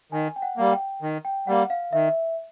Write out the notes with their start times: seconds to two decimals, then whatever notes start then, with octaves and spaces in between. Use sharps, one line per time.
0.12 D#3 G#5
0.36 G5
0.42 F#5
0.57 G3 A#3
0.72 G5
1.02 D#3
1.25 G5
1.47 G3 A#3 F#5
1.70 F5
1.93 D#3 E5